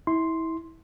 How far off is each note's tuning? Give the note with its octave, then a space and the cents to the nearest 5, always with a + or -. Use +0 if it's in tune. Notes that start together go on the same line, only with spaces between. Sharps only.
E4 -25 C6 +0